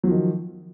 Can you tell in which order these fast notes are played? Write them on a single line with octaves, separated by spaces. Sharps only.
F#3 F3 D#3